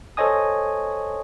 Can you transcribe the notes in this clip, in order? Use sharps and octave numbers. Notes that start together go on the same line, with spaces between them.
A4 C5 C#5 D#5 G#5 D#6